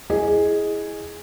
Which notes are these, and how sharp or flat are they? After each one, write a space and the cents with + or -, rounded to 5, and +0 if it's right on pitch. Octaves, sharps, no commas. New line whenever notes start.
E4 +0 G#4 +0 D#5 +0